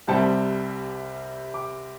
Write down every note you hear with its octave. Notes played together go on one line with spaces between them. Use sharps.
C2 C3 G3 C4 A5
D6